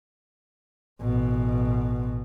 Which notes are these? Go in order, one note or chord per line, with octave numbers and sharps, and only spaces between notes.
A1 B2